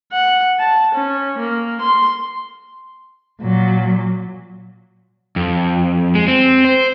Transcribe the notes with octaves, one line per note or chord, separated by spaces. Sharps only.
F#5
A5
C#4
A#3
C6
A#2 F#3
F2
G#3
C4
C5